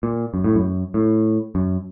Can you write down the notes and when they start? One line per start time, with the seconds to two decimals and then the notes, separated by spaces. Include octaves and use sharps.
0.03 A#2
0.34 F#2
0.44 A2
0.56 F#2
0.94 A2
1.55 F#2